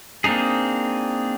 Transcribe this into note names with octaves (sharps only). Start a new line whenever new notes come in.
A#3 C4 D4 D#4 G#4